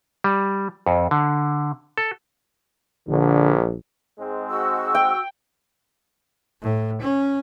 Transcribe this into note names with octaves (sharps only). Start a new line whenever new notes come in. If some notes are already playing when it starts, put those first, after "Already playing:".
G3
F2
D3
A4
A#1 D3
G#2 G#3 C4
F#4 E6
G5
A2
C#4